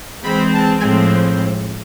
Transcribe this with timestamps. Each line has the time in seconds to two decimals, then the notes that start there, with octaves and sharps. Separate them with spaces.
0.24 E3 G#3 C4 B5
0.53 A5
0.82 A2 F3 G#3 C4 G#5